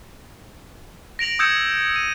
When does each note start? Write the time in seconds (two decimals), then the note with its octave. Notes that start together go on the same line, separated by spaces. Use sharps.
1.19 A#6 D7 F7 F#7
1.39 D#6 E6 G6 G#6 C#7 E7
1.96 D#7